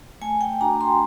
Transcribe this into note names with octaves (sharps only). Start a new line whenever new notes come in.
A3 G#5
G5
D4 F#4 A#5
C6